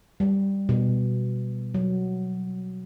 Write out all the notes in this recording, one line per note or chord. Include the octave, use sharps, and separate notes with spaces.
G3
B2
F#3